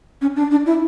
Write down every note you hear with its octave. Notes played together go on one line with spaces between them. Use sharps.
C#4
D4
D4
E4